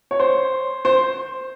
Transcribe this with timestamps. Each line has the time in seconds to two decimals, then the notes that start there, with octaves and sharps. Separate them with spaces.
0.11 C#5
0.20 C5
0.85 C5